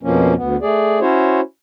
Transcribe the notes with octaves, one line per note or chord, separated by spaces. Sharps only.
F2 B2 F3 A#3 C#4
D2 B3
A3 G#4 D5
C#4 E4 F#4 C5 C#5